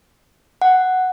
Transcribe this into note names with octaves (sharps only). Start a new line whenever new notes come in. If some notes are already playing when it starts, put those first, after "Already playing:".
F#5